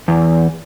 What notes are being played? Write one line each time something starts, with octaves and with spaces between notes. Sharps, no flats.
E2